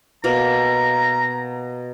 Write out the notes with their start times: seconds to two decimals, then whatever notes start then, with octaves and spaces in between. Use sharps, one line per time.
0.24 B2 A#3 A#5